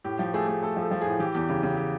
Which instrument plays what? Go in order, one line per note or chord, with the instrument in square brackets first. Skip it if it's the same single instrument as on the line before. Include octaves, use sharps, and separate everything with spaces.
[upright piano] A2 G4
F3
A3 G#4
A3
A3 A4
F3 A4
F3
A2 G#4
E3 G4
E2 G4
C#3 G4
C#3 G4
G4